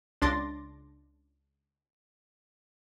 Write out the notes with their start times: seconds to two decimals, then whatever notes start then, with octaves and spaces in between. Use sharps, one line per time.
0.22 C#2 D4 C6 D6 A6 A#6